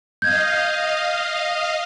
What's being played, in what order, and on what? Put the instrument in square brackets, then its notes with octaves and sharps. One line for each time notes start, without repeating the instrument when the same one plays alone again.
[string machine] D#5 F5 [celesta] G6 G#6